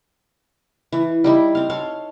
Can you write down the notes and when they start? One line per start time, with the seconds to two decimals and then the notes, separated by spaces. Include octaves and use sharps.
0.92 E3
1.24 G3 D#4 E4
1.55 C4 F5
1.70 A4 C#5 F5